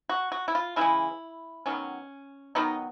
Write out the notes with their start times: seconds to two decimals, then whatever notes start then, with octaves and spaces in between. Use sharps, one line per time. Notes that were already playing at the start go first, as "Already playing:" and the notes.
0.09 F#4
0.32 F#4
0.48 E4
0.55 F4
0.76 C#3 E3 G#3 E4
1.66 D#3 F#3 B3 C#4
2.55 D#3 F#3 B3 D#4